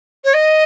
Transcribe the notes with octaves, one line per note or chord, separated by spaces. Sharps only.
C#5
D#5